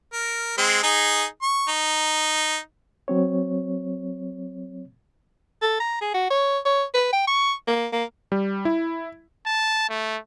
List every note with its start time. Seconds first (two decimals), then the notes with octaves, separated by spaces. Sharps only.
0.13 A#4
0.58 G#3 C4
0.83 D#4 G#4
1.42 C#6
1.69 D#4
3.08 F#3 C4 C#5
5.62 A4
5.80 A#5
6.01 G#4
6.14 F#4
6.30 C#5
6.65 C#5
6.94 B4
7.13 G5
7.27 C#6
7.68 A#3
7.93 A#3
8.32 G3
8.65 E4
9.47 A5
9.90 A3